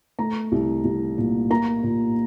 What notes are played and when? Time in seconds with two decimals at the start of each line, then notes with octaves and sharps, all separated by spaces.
0.19 A3 A#5
0.52 C2
0.85 C2
1.18 A#2
1.50 A#3 A#5
1.83 A#2